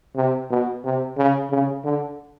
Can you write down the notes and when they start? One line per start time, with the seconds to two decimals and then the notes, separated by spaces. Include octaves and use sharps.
0.16 C3
0.50 B2
0.84 C3
1.17 C#3
1.51 C#3
1.84 D3